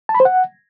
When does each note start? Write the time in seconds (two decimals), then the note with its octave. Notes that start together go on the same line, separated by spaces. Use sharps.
0.09 A5
0.15 B5
0.20 C5
0.25 F#5